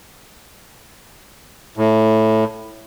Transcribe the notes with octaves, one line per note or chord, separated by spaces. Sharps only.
A2